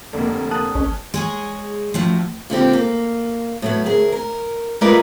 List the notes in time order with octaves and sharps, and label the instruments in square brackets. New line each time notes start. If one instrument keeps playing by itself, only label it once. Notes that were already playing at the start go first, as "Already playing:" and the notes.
[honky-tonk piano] F1 A#3 [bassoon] D3
[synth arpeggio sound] A5 D#6 F#6
[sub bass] A1 [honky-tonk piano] C#4
[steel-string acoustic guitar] G#3 G#4 C#5
F#2 A2 F3
A#2 D3 C4 G4
A#3
A2 F#3 B3
D2 G#4 A#4
A#4
G#3 A3 F4 A#4 B4 D5